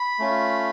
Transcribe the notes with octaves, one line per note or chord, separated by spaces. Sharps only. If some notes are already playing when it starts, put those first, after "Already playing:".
Already playing: B5
A3 C#4 F4